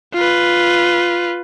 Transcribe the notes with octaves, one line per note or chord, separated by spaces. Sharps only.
F4 B4